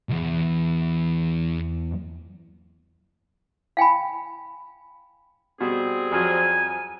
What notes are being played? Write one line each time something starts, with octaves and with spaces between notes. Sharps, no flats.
B1 E2
F5 G5 G#5 B5
B2 G3 C4 G#4
F2 F3 F#3 G#5